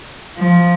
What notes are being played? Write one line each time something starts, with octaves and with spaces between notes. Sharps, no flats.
F3